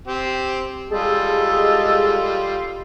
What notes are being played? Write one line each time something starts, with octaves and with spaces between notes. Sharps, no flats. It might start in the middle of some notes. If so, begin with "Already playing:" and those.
C4 G4
G3 G#3 F4 G#4 A4